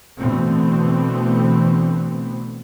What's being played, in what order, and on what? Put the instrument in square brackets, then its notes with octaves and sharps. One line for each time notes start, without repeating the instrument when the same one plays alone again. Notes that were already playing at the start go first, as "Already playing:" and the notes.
[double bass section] B2 D3 E3 A3 B3 C4